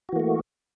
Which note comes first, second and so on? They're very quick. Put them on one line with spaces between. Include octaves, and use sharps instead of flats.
F#4 E3 A#3 A3